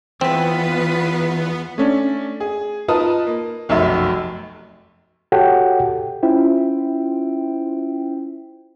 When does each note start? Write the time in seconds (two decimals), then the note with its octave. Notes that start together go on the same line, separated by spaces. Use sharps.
0.21 E2 B3 C4 F4 B4
1.78 A3 C#4 D4
2.40 G#4
2.88 D#4 F4 A#4 B4 A5 D#6
3.27 A#3
3.69 F1 B1 F#2 F#3 E5
5.32 F#4 G4 A4 C#5 F#5 G5
6.22 C#4 E4 F4 C5 E5 G5